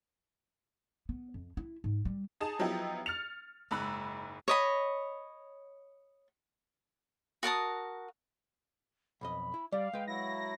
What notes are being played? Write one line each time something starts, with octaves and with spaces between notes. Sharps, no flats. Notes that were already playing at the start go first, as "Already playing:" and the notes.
B3
F2
E4
G#2
G3
D#4 G#4 A5
F3 F#3 B3 D#4 E4 G4
F6 A6 C#7 F7
F#1 G#2 A#5 B5 E6 F#6
C#5 D#5 B5
F#4 A#4 A5 D#6
B1 F2 D#5 B5
E4
G3 D5 F5
G#3 B4 G5
F#3 E4 F5 A#6